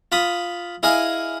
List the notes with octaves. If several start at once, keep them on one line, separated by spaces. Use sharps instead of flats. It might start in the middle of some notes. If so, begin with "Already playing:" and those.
F4 B5 D#6
E4 G#4 D#5 F5 G#5